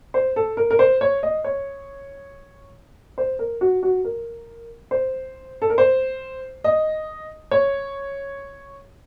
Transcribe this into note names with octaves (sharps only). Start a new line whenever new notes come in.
C5
A4
A#4
A#4
C5
C#5
D#5
C#5
C5
A#4
F#4
F#4
A#4
C5
A4
A#4
C5
D#5
C#5